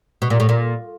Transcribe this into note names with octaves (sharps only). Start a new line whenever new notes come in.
B2
A#2
A2
A#2